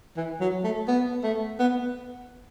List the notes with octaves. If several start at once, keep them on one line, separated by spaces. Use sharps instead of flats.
E3
F#3
A3
B3
A3
B3